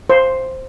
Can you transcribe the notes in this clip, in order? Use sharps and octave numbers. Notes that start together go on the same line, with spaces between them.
C5